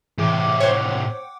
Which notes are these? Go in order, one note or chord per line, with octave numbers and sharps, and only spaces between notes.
A2 C3 E3 G#4 D6
C5 C#5 F#5 G5 D6